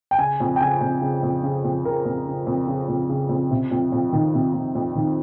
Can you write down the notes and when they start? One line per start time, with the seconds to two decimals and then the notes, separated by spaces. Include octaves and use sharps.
0.11 G5
0.18 C#3 G#5
0.40 F2
0.56 G5
0.61 C#3 G#5
0.81 F2
1.01 C#3
1.23 F2
1.43 C#3
1.64 F2
1.85 C#3 A#4
2.05 F2
2.26 C#3
2.47 F2
2.67 C#3
2.89 F2
3.09 C#3
3.29 F2
3.51 C3
3.71 F2
3.92 F2
4.13 D#3
4.34 C3
4.54 F2
4.75 F2
4.95 D#3